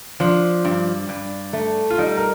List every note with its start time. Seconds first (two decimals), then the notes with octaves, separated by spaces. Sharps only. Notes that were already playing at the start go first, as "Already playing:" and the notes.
0.20 F3 D4
0.65 G2
1.09 G2
1.53 A3
1.90 F4
1.98 G3 D#4
2.17 A#4